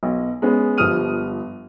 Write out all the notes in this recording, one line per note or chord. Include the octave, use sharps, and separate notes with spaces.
B1
G#3 B3 C#4
G1 F3 G3 D#6 F6 D#7